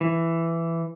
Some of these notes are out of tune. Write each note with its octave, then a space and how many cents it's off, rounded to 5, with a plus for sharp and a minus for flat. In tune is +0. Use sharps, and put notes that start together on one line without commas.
E3 +10